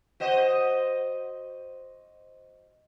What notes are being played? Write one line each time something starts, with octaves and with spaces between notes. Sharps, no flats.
F#4 C5 D#5